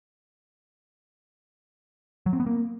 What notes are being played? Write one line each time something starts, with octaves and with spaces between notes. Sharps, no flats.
F#3
C4
B3
A#3